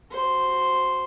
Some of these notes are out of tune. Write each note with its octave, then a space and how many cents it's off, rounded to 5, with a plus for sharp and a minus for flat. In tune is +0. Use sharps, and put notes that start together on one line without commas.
F#4 -10 C5 +0